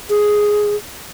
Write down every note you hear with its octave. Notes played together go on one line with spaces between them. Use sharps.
G#4